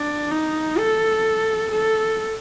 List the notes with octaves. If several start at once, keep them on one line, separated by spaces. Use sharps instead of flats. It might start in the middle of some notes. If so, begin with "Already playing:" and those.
Already playing: D4
D#4
A4
A4